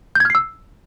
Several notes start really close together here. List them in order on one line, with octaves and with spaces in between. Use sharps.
G6 G#6 F6 C7 E6